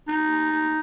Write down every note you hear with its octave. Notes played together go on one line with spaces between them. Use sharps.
D#4